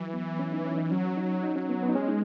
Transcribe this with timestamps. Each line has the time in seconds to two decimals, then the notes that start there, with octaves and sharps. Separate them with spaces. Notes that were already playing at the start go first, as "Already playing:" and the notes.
Already playing: E3 F#3
0.14 B3
0.39 C#4
0.52 D#4
0.65 C#4
0.78 D#4
0.91 F#3 C#4
1.17 D#4
1.43 D#4
1.56 C#4
1.69 B3
1.83 B3
1.89 D#4
1.95 G#3 C#4
2.08 D#4